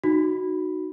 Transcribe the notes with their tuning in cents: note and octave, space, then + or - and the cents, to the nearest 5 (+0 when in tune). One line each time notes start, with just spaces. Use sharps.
D#4 -10 F#4 +0 B5 +0